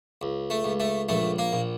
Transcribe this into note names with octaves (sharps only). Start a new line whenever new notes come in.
C#2
A3
C#2
A3
A#1 A3
A#3
A#1